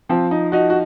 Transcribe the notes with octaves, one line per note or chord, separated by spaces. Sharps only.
F3 C4
D#4
D#4 F#4
F#4